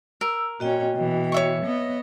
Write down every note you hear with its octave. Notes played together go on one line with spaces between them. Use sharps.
A#4 E6
A#2 C#4 F#4 D#5 G5
B2 E3
C#5 E5 C#6
B3 D#5